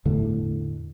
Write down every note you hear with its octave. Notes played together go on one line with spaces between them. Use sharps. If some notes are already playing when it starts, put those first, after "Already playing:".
E2 A2 D3 A3